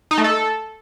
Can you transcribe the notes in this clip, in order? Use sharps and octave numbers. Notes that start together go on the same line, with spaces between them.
D#4
A3
A4